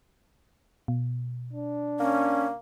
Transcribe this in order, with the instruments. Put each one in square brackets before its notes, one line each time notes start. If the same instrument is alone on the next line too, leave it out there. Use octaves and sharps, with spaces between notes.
[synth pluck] B2
[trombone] D4
[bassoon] A#3 [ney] C#4